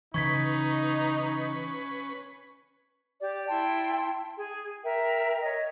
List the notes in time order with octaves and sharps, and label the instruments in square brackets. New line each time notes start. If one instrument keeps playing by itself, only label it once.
[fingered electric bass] C#3 E3 [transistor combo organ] C#4 B4 [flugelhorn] D#4 [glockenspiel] C#6 G#6 B6
[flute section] G4 D5
E4 G5 A5 C6
G#4
A#4 E5 G5
C#5 D#5